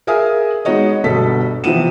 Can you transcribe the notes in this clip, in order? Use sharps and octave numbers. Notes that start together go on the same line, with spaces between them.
G#4 A#4 E5 F5 G#5 D#6
G#3 B3 D#4 F#4 C#5 D#5
G1 B2 A4 B6
C3 E3 F3 B3 D#7 E7